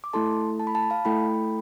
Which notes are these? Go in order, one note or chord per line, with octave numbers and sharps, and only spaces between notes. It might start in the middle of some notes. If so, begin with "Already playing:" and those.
D6
A3 E4 A4 A5 C6
A5
B5
A5
B5
F5 A5
A3 E4 A4 G5 B5